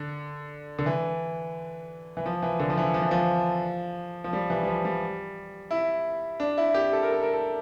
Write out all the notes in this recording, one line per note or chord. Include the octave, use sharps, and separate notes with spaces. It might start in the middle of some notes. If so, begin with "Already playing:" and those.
Already playing: D3
D3
E3
E3
F3
E3
D3
F3
E3
F3
E3
F3
F3
G3
E3
G3
F3
G3
E4
D4
E4
G4
A4
A#4
A4
A#4
A4